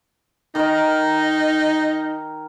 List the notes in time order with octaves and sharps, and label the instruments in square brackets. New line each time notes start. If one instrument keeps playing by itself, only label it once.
[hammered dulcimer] D#3 A#4 [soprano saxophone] D#4